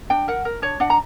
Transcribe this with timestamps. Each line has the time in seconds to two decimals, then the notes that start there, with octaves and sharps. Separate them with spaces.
0.10 D4 G5
0.28 A#4 F#5
0.45 A#4
0.62 D4 C#5
0.80 D4 F#5
0.90 A#5